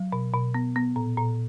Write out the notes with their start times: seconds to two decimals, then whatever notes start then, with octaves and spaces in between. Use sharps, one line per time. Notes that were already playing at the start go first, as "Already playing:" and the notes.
Already playing: F#3
0.13 B2
0.34 B2
0.54 B3
0.76 B3
0.96 A#2
1.18 A#2